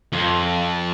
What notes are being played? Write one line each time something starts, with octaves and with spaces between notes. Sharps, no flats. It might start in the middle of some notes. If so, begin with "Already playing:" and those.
F2